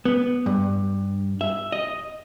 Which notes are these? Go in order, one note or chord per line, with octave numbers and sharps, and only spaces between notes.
B3
G2
E5
D#5